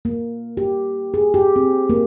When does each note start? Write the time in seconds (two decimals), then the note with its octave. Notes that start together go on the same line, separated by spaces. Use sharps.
0.05 A#3
0.57 G4
1.14 G#4
1.34 G4
1.56 C4
1.90 A#3